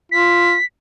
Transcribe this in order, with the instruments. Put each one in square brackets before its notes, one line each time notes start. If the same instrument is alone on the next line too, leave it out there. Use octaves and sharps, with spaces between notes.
[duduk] F4 [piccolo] B6